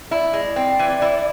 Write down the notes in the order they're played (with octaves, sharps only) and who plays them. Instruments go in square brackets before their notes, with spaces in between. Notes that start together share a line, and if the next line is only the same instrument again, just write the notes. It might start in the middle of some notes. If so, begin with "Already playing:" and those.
[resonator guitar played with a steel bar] E4 [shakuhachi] D5
[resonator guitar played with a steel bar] G#3
C4
E3
E4